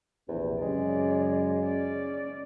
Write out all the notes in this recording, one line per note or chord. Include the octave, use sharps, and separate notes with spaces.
A#1 E2 C3
F#2 C#3 G#3 D5
C#4 D5